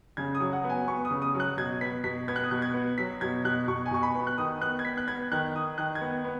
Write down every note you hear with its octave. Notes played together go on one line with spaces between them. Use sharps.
C#3 G#6
D#6
F#3
F#5
B3
G#5
B3 C#6
D#6
C#3
D#6
F#3
F#6
B2 G#6
B3 B6
B2 B6
B3 G#6
F#6
D#6
B2 F#6
G#6
B3
F#3 B6
B2 G#6
B2 F#6
B2 C#6
G#5
B2 C#6
B5
B3
F#6
D#3 D#6
B3 F#6
G#6
B3 B6
F#6
B3 G#6
D#3 F#6
D#3 D#6
D#3 F#6
G#6
B3
B3